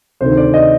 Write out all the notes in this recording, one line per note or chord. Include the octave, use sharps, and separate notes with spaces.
D2 C3 D#3 C5
D5
D#5